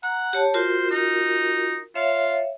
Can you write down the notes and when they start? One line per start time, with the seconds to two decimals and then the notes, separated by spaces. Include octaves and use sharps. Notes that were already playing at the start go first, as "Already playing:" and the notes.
0.03 F#5 A#5
0.33 G4 C#5 A5
0.54 F4 F#4 A#4 C5
0.91 D#4
1.95 F4 C#5 E5 F5